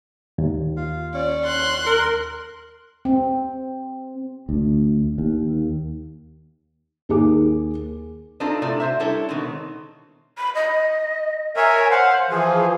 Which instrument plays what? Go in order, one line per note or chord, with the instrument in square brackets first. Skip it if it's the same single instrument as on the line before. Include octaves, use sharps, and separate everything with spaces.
[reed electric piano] D#2
[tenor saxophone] F4
[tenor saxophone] C#4 [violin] D5
[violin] C6 F#6
[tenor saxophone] A#4
[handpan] C4
[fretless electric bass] D2
D#2
[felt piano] D#2 G#4 D6
[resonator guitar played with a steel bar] C4 D4 D#4 F4 A4
A2 C3 A4 D5
F#4 C5 E5
G3 D4 E4 A4 C#5
B2 D#3 G#3 C4
[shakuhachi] B5
D#5
[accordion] A#4 C#5 E5 [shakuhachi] G#5
[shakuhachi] C5 [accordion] F5 F#5
[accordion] E3 F3 [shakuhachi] G#4